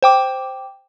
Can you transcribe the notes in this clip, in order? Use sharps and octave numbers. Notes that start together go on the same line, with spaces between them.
C5 G5 D6